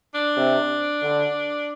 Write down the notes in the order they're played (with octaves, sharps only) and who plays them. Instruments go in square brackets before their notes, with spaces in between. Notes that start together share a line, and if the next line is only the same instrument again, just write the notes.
[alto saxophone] D4
[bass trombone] C3
D3